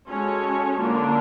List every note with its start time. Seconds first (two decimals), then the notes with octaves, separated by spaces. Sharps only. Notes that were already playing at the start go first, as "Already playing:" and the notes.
0.09 G#3 C#4 F#4 A4 C#5
0.80 D3 F#3 A#3 D4 F4